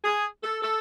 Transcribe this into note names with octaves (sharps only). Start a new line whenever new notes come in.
G#4
A4
A4